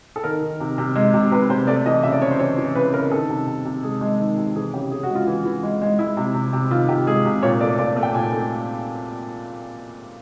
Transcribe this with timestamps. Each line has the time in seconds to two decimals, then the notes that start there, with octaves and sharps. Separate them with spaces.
0.16 A4
0.24 D#3 A#4
0.42 D#3
0.60 C3
0.78 C3
0.96 G#3
1.14 C3
1.32 C3 B4
1.50 C3 C5
1.67 A3 D5
1.86 E3 D#5
2.03 C#3 E5
2.12 D5
2.22 C#3 C#5
2.30 C5
2.39 E3 C#5
2.58 E3
2.75 C#3 B4
2.94 C#3 A#4
3.11 D#3 A4
3.29 C3
3.47 C3
3.65 C3
3.83 G#3 G#4
4.01 G#3
4.19 D#3
4.38 C3
4.55 E3 G#4
4.73 C#3 G4
4.91 C#3 G#4
5.03 F#4
5.09 G#3
5.15 F4
5.27 E3
5.45 E3
5.63 G#3
5.82 G#3
5.99 G#3 E4
6.17 C3
6.35 C3
6.53 C3
6.71 D#3 F4
6.89 C3 G4
7.07 G#3 G#4
7.25 C3
7.43 A#2 C#5
7.61 A3 D5
7.79 A#2 D5
7.96 A3
8.03 G5
8.14 A#2 G#5
8.33 A3